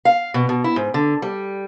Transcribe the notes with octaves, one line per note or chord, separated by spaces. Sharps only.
F5
B2
B2
E4
G#2
D3
G3